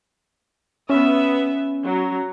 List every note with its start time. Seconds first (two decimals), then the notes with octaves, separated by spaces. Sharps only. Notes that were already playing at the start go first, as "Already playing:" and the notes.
0.90 B3 C#4 E5
1.84 F#3